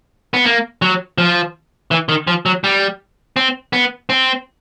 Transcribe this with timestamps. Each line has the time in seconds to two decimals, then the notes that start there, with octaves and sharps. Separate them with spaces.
0.34 B3
0.45 A#3
0.82 F#3
1.18 F3
1.91 E3
2.09 D#3
2.27 F3
2.46 F#3
2.64 G3
3.36 C4
3.73 B3
4.09 C4